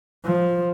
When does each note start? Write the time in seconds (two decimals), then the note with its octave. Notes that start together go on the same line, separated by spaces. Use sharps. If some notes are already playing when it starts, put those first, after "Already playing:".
0.24 F3